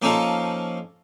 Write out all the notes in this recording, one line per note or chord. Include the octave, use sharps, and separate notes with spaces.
F3 A#3 C#4 D#4 F4 A4